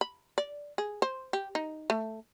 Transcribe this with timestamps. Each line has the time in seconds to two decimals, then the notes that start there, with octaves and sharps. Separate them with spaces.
0.01 B5
0.38 D5
0.78 G#4
1.02 C5
1.33 G4
1.55 D#4
1.90 A3